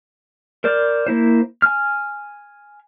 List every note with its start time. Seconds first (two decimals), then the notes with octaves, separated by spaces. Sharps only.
0.64 A#4 C5 D5 F6
1.07 A#3 E4 C5
1.62 G#5 F6